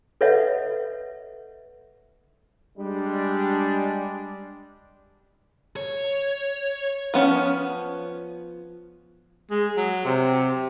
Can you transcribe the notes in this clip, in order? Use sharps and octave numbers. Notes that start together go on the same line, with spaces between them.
A4 B4 C#5 D#5 E5 F#5
G3 G#3 D4
C#5
F3 B3 C#4
G#3
F#3
C3